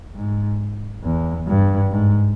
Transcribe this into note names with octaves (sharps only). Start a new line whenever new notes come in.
G#2
E2
G2
G#2